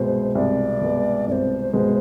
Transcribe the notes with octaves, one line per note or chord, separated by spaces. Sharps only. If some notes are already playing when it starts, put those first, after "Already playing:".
Already playing: C2 B2 G#3 B3 C5
C2 D5
B2 G#3 B3
C2 C5 D5
B2 G#3 B3